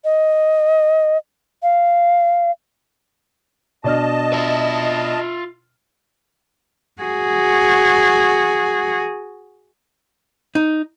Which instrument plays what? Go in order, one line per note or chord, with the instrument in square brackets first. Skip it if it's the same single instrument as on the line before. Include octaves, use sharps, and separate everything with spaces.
[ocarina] D#5
F5
[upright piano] B2 D4 F6 [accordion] D#5 A5
[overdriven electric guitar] F4 E5
[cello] F#4 G#4
[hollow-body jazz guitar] D#4